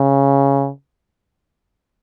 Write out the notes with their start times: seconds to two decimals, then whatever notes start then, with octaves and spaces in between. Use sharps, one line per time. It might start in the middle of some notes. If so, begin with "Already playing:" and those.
Already playing: C#3